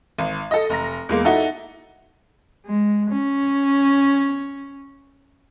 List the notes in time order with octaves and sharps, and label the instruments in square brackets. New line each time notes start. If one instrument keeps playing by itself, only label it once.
[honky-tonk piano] G#1
A4 D#5
F1 A#5 A#6
E2 G#3 A#3
D#4 E4 F#4 A4
[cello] G#3
C#4